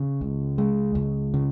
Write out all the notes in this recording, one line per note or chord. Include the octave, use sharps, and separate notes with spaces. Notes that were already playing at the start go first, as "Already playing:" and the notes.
Already playing: C#3
C#2
G#3
C#2
C#3